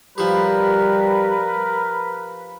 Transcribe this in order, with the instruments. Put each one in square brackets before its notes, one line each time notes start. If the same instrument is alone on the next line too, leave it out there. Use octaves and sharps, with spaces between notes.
[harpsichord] F3 G4 [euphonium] G3 [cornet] A#4 [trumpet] B4